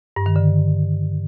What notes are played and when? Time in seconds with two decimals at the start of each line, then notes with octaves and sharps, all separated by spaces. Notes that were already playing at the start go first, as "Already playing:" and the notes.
0.16 G2
0.26 D#3
0.36 D3